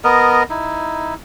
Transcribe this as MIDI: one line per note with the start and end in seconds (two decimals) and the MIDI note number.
0.04 0.43 59
0.04 0.43 70
0.04 0.43 75
0.50 1.14 63
0.50 1.14 64